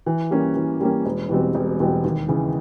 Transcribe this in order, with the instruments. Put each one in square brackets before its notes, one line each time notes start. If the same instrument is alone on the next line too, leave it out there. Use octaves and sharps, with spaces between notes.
[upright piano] E3
G3 A#3 C#4
E3
G3 A#3 C#4
E1
E2 B2 G3 C4
E1
E2 B2 G3 C4
D#2
C#3 E3